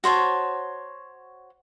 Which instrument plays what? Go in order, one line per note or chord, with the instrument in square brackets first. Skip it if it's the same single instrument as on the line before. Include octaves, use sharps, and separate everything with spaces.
[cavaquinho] F#4 C5 C#5 A5